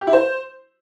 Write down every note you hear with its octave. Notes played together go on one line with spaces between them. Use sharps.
G4
E4
C5